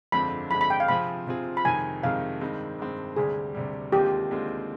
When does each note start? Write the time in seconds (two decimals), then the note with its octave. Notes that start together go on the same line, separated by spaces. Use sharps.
0.12 G1 F2 D3 G#3 C4 B5
0.51 G1 F2 D3 G#3 C4 B5
0.61 B5
0.70 G5
0.80 F5
0.88 C3 F3 C4 F4 G#4 B5
1.27 C3 F3 C4 F4 G#4
1.57 B5
1.65 F2 C3 D#3 G#3 G#5
2.03 F2 C3 D#3 G#3 F5
2.41 G2 D#3 G#3 C4
2.79 G2 D#3 G#3 C4
3.16 D2 C3 G3 G#4
3.55 D2 C3 G3
3.92 D#2 D3 G#3 C4 F4 G4
4.31 D#2 D3 G#3 C4 F4